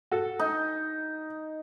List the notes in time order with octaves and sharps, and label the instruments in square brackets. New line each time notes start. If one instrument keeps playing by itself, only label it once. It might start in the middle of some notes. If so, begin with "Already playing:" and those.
[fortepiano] F#4 A4
[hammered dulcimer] D#4